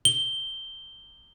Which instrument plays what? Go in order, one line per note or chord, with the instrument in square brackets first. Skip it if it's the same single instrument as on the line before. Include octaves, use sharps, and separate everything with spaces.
[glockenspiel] G7